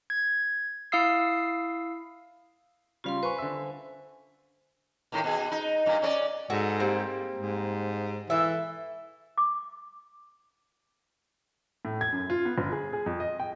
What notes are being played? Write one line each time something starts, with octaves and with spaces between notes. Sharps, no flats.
G#6
E4 F5 D#6 E6 C7
C#3 G3 F4 F5 C6
B4 C5 G#5 C#6
D3 E5
D#2 A2 D#3
B2 G#4
D#4
G2 A#2
C#4 D4 D5
G#2 F#4 A4
G3 A#3 C4
G#2
E3 A4 E5
D6
A2
G#6
F#2
F4
B3
G1
G#4
G#4
F2
D#5
G5